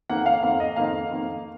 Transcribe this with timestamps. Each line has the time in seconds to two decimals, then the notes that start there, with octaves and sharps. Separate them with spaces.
0.10 F2 D#3 A#3 F#5
0.26 F5
0.43 F2 D#3 A#3 F5
0.60 D#5
0.76 F2 D#3 A#3 F5
1.11 F2 D#3 A#3